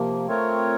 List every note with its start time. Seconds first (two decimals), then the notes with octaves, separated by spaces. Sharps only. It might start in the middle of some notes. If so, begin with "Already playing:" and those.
Already playing: C3 F3 A#3
0.26 A3 C4 F4 A#4 C#5